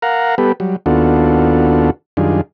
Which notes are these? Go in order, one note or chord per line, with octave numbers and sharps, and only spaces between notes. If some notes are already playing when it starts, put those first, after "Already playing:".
A#4 F5 F#5 A#5
G3 B3 G4 A4 B4
F#3 G3
D#2 B3 D4 F4 F#4 A4
F#2 D#3 G3 D4 F4 G#4